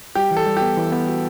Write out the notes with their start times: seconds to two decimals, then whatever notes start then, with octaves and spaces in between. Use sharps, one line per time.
0.15 G3 G4
0.31 E3
0.37 A4
0.47 G3
0.57 B3 G4
0.77 E3
0.92 B3
1.08 F#4